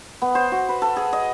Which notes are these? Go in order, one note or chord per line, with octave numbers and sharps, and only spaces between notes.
B3
C5
F#4
B4
A4
G#4
D#5